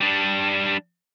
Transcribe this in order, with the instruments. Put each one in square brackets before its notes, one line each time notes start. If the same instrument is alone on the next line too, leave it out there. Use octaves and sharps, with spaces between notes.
[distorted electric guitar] G3 D4